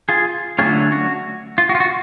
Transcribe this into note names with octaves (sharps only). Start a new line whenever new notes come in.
F4 G#4
D3 F#3 A3 C#4 F4 G#4
F#4
F4
F#4
F4
F#4